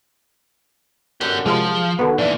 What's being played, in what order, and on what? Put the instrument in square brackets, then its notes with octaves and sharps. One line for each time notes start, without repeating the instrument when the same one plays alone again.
[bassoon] F#2 [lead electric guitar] D3 G4 [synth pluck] F#5
[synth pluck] C3 G#3 F4 [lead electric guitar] F3
[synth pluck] D3 D#3 B3 [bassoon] F#4
[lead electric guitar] A#2 E3 [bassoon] D4